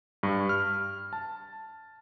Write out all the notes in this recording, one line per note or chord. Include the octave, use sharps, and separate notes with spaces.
G2
F6
A5